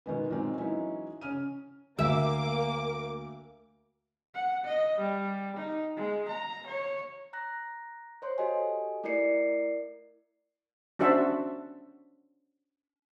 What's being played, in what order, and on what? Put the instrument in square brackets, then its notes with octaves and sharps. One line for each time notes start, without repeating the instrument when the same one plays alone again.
[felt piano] B2 D#3 G#3 B3
A#2 D#3 F#3 G#3 C4
E3 F#3 G#3 C#4 D#4 E4
C#3 C#4 F6 D#7
[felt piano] D2 [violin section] A#3 D6 D7 [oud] E5
[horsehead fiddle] F#5
D#5
G3
D#4
G#3
A#5
C#5
[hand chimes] A#5 F#6 A#6
C5 C#5 C6
F#4 G4 A4 D#5 G#5
A3 E4 A#4 D5 C7 C#7
[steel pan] C#4 D4 F#4 C5 E5 A5